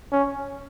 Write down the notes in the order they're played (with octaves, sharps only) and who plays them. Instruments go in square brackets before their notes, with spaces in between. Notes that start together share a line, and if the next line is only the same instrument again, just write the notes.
[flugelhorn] C#4